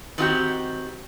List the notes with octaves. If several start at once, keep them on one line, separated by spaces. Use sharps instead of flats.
D#3 C4 F#4 G4